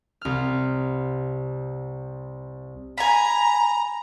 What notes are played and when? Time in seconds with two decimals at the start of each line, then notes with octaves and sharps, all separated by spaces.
0.21 C2 F6
2.98 G#5 A#5 B5